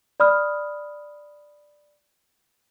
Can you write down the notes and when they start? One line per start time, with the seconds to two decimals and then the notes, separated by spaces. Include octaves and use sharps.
0.20 D5 B5 D#6 F6